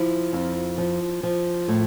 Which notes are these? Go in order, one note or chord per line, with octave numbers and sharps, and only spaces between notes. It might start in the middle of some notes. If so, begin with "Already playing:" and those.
Already playing: F3 E4
F2
F3
F3
A2